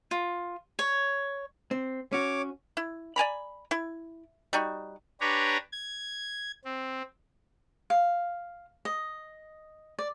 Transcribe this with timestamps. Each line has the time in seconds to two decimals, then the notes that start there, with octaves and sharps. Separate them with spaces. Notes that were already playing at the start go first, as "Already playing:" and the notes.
0.11 F4
0.79 C#5
1.71 C4
2.13 C#4 F#4 C#5 D6
2.77 E4
3.16 D5 G#5 A#5 B5
3.71 E4
4.53 G3 D#4 F#4
5.21 D4 G4 B4 C#5 A#5
5.72 G#6
6.65 C4
7.90 F5
8.85 D#5
9.99 D5